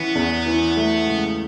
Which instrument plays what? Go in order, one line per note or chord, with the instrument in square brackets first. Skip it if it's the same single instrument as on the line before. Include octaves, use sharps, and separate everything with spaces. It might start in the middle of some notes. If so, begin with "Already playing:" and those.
Already playing: [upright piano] E3 C#4 [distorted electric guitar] B3
[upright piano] E2
E3
A3
C#2